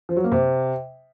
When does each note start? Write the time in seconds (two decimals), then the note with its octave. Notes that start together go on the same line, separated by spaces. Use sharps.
0.09 F3
0.17 F#3
0.24 A#3
0.32 C3